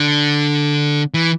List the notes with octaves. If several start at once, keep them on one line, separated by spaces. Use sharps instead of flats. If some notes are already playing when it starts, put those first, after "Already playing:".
Already playing: D3
E3